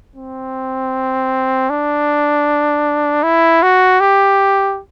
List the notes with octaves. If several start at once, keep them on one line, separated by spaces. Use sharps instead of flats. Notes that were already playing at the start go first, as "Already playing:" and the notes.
C4
D4
E4
F#4
G4